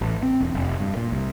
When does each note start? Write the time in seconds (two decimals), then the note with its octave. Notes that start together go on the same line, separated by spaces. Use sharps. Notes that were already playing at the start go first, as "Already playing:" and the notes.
0.01 A1
0.23 C4
0.40 E1
0.54 F1
0.80 G2
0.97 A#2
1.12 C2